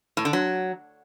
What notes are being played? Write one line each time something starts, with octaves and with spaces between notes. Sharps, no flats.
A2
D3
F#3